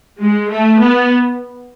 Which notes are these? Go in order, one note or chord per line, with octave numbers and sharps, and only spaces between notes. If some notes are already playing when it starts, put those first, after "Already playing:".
G#3
A3
B3